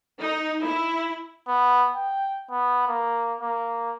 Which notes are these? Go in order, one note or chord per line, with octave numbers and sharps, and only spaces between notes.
D#4
E4
B3
G5
B3
A#3
A#3